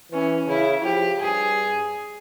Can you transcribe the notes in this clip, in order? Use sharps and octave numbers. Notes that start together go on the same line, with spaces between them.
E3 C#4
C#3 E4
F3 G4
G2 G#4